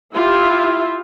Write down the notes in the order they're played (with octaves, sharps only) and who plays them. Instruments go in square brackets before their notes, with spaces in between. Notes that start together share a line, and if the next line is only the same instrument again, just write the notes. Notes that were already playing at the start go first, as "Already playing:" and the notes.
[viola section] E4 F4 G4 E5